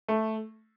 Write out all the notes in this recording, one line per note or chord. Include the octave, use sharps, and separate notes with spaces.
A3